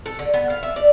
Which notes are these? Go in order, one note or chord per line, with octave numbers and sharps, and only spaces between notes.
A4
D3
B3
F5
E5
D5